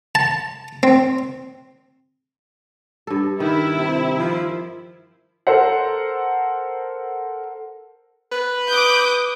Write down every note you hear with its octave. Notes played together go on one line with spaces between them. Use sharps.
A5
C4
G2 A4
D#3 E4
C3
F3
A4 A#4 C5 F#5
B4
D6 D#6 G6